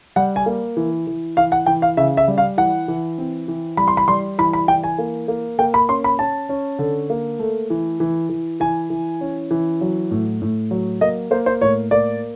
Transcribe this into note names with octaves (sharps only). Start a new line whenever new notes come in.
G3 F#5
G#5
A#3
E3
E3
E3 F5
F#5
E3 G5
F5
C#3 E5
E5
G3
F5
E3 F#5
E3
C4
E3
G3 B5
C6
B5
G3 C6
E3 B5
B5
E3 G5
G#5
A#3
A#3
A#3 G5
B5
C#4 C6
B5
C#4 A5
C#4
D3
A#3
A3
E3
E3
E3
E3 G#5
E3
C#4
E3
F#3
A2
A2
F#3
A#3 D#5
A#3 C5
C5
A2 C#5
A#3 D5